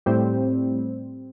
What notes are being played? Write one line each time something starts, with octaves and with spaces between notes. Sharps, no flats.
A2 G3 C4